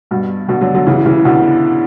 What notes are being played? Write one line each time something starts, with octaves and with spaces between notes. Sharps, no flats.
G2 B2
B2 D3
D3 F#3
D3 F#3
C#3 E3
C#3 E3
B2 D3